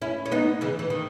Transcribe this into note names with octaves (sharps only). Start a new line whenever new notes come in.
C#4 E4
C#4
B3 D#4
C#3 E3
E3
D#3